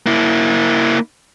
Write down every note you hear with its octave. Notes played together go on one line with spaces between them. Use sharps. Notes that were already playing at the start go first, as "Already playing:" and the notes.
A#3 E4